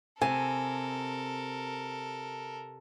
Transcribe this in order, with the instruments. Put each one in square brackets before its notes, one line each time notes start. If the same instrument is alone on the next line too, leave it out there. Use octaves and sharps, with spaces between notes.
[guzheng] C3 [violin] A4 A#4 [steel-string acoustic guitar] G#5